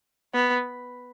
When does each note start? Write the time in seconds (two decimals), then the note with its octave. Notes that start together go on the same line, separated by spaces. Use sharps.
0.34 B3